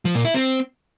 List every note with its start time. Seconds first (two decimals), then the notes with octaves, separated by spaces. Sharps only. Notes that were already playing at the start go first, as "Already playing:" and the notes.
0.05 F3
0.15 A#2
0.25 E4
0.34 C4